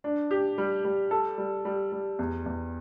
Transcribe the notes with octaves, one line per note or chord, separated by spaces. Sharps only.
D4
G4
G3
G3
A4
G3
G3
G3
E2
E2